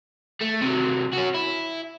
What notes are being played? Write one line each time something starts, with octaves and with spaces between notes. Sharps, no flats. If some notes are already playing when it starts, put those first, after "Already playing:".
A3
C3 F#3
C#4 F#4
E4